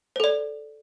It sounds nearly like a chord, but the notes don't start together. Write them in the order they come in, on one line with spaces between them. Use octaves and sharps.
C5 A4 D5